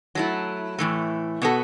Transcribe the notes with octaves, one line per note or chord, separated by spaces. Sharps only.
F#3 A3 E4
A2 E3 A3
B2 B3 F#4 A4